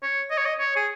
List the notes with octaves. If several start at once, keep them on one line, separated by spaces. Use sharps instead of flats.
C#5
D#5
C#5
D#5
C#5
G#4